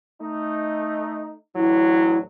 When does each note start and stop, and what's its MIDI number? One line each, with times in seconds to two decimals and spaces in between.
0.22 1.36 57
0.22 1.36 63
1.56 2.23 33
1.56 2.23 38
1.56 2.23 54
1.56 2.19 64